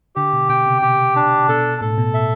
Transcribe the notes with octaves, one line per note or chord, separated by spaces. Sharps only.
D3 G4
B2
B2 G5
C3
B2 G4
D4
B2 A4
A2 A4
B2
E5